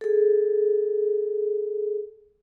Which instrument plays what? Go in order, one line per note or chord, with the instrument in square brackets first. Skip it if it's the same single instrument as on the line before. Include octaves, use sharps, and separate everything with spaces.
[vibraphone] G#4 A4